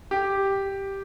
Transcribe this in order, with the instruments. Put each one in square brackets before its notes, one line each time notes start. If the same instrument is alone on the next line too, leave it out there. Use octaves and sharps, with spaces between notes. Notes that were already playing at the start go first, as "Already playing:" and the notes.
[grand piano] G4